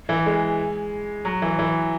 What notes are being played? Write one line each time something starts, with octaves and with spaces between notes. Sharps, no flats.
E3
G#3
F#3
E3
E3